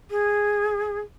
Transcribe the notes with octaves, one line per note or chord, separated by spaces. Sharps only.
G#4